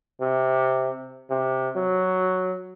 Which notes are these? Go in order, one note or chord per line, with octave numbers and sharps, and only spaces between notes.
C3
C3
F#3